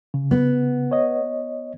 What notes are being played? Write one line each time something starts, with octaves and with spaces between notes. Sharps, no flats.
C#3
B3
C#5 D#5